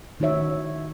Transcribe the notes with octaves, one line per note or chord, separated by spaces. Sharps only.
D#3 D#4 F#4 C#5 E5